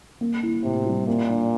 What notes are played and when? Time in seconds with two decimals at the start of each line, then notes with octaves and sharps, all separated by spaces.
0.21 A#3
0.43 E4
0.64 A2 C3
0.85 G3
1.07 A#2 A#3
1.29 D4